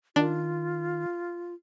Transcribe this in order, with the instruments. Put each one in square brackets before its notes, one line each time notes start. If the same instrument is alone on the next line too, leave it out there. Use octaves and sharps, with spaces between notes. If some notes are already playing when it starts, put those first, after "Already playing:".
[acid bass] D#3 [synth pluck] D4 [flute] F4